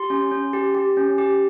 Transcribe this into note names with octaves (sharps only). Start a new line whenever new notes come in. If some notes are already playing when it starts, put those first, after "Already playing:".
Already playing: G4 C6
C#4
C#4
G4
G4
C#4
G4